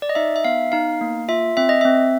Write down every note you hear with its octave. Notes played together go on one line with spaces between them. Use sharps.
D5
D#5
D#4 E5
E5
B3 F5
D#4 F5
A#3
F4 E5
C4 E5
D#5
C4 E5